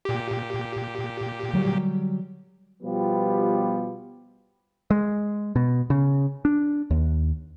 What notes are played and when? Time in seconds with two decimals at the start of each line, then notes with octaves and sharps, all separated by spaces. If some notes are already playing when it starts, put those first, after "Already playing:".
0.05 A#2 G4
1.53 D3 F#3 G3
2.83 B2 F3 G3 B3 F4 G4
4.91 G#3
5.56 B2
5.90 C#3
6.45 D4
6.91 D#2